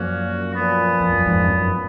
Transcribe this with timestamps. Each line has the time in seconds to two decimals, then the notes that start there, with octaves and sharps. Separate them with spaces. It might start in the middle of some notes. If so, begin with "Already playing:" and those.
Already playing: F#2 A#2 F3 A#3 C#4 F#4
0.53 A#2 F3 B3
1.01 F2
1.13 F#2
1.26 F2 G#2
1.50 F#2